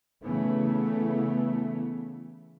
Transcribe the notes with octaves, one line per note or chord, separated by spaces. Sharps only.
C#3 E3 A3 B3